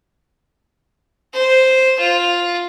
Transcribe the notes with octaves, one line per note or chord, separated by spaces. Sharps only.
C5
F4